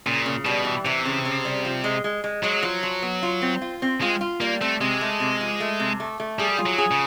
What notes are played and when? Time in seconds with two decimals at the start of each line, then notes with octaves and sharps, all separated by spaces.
0.06 A#2 C#3
0.26 C#3
0.45 B2 G3
0.65 E3
0.85 C3 E3
1.05 C#3
1.25 C#3
1.45 G3
1.65 F3
1.84 G#3
2.04 G#3
2.24 G#3
2.43 F#3 G#3
2.63 F3
2.83 F3
3.02 B3
3.23 F4
3.42 C4
3.62 F4
3.82 C4
4.01 G#3 F4
4.21 F4
4.40 G3 A#3
4.61 A3 C4
4.81 C3 G#3
5.01 A3
5.20 C3
5.41 F3
5.60 A3
5.80 C3
6.00 A3
6.20 A3
6.39 G3 G#4
6.58 F4
6.66 F#3
6.78 G#4
6.91 C#3